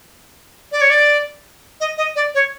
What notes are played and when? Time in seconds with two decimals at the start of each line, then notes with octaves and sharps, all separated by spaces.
0.72 D5
0.81 C#5
0.90 D5
1.80 D#5
1.98 D#5
2.16 D5
2.35 C#5